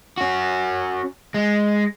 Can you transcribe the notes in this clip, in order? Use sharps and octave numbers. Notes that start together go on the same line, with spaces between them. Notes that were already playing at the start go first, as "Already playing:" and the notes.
C#4 F#4
G#3